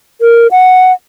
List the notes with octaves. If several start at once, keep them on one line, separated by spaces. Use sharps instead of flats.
A#4
F#5